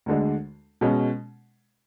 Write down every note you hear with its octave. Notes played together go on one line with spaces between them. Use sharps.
D2 D3 G#3 D4
B2 G#3 C#4